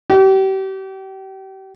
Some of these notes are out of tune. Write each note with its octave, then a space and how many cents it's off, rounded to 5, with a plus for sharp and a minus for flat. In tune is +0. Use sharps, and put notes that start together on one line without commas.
G4 -35